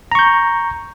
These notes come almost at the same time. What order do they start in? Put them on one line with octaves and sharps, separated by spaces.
A#5 C#6 G6